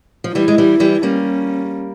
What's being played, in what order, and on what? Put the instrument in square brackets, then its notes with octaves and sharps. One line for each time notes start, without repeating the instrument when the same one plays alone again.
[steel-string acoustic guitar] F3
[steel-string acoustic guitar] E3 G3 [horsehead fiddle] E4
[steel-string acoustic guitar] G#3
E3 G3
E3 G3
[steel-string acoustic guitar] G3 A#3 [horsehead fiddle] C#4